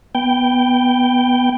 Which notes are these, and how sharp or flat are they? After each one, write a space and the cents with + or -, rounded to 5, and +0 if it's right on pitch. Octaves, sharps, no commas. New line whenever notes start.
B3 +0 G5 +0